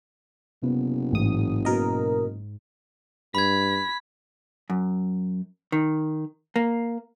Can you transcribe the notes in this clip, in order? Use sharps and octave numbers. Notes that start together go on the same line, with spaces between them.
F#1 C3 B3
A1 G#2 D#6
B2 A#4 D#5
G2 B5 G#6 B6
F#2
D#3
A#3